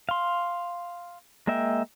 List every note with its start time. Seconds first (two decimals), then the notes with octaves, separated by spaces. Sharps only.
0.09 F5 C6
1.47 G#3 A#3 D#5 E5 G5